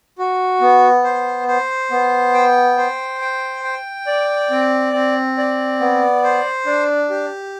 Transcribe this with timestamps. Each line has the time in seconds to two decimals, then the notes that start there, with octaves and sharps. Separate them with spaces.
0.18 F#4
0.61 B3
1.04 C5
1.48 C5
1.91 B3
2.34 G5
2.77 C5
3.21 G5
3.64 G5
4.07 D5
4.50 C4
4.93 C4
5.37 D5
5.80 B3
6.24 C5
6.66 D4
7.10 G4